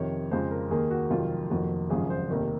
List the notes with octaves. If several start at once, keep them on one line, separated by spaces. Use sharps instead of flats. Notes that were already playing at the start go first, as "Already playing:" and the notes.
Already playing: F2 C3 D#3 C#5
F2 C#3 F3 G#3 C5
A#4
D#2 D#3 A#3 G#4
F#4
F1 F2 D#3 F#3 F4
F1 F2 D#3 A#3 F#4
G#1 F#2 C#3 F3 G#4
C5
F1 D#2 D#3 A#3